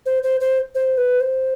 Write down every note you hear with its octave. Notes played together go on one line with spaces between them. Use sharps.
C5
C5
C5
C5
B4
C5